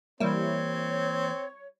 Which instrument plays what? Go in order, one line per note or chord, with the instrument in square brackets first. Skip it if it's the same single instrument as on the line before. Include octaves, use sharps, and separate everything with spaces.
[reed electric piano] E3 A#3 [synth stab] G3 E4 [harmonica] C4 [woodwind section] C#5